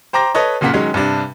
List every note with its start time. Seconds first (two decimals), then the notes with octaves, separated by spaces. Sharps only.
0.13 C5 G5 A#5 D6 A#6
0.35 A4 B4 C#5 D#5
0.61 F#1 A#2 C#3 A#3 F#5 B6
0.73 D#3 F#3 G#3 C#4
0.94 G2 C3 D4